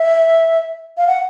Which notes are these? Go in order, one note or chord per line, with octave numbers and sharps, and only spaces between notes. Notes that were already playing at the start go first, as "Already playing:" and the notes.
Already playing: E5
F5
F#5